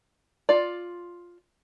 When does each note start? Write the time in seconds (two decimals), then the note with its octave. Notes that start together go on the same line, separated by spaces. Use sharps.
0.49 F4 D5